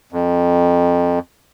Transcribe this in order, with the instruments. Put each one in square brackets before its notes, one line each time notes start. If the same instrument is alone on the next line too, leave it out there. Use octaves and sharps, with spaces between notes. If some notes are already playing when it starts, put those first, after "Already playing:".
[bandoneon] F2